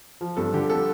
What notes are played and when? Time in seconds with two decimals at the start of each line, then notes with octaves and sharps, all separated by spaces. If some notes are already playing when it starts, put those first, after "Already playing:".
0.21 F3
0.37 G2 A4
0.53 D3 G4
0.70 A4